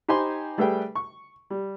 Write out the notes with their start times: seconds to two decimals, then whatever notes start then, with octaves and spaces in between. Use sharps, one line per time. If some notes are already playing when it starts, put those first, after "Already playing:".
0.08 D#4 G4 C5 G#5 B5 C6
0.58 G3 A3 G#4 A4 B4 G5
0.95 C#6
1.50 G3